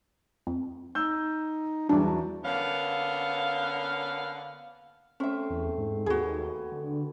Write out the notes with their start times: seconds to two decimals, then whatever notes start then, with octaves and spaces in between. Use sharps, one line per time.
0.47 F2
0.95 D#4 E6 G6
1.89 E2 E3 F#3 G3 D4 D5 A5
2.45 D3 A#3 B3 C#4 F5
5.20 A3 C4 C#4 C5 E5
5.50 E2
5.78 G#2
6.06 D#2 B3 F#4 G#4
6.72 D3